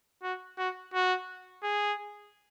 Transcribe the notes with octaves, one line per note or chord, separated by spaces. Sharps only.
F#4
F#4
F#4
G#4